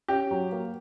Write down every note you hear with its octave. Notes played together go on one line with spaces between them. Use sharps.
C#4 G4
F#3
A#3